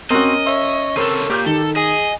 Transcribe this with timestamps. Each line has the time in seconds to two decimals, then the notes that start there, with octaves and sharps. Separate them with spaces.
0.10 C4 C#4 F#4 A#4 D#5
0.47 C#5 E5
0.96 C#3 C4 A4 A#4 D#7
1.30 A#2 G4 F6 G6
1.46 D#3 A4
1.76 G#4 D#5 G#5